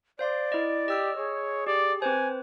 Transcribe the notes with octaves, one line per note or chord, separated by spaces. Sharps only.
C5 D5 F5 C6
E4 D#5
G4 D#5 E6 F6
G#4 C#5
G4 D5
C4 B4 C5 G#5